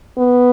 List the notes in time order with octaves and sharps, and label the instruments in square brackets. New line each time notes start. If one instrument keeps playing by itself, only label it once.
[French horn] B3